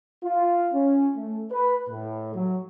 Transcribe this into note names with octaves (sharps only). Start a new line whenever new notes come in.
F4
C#4
A3
B4
A2
F#3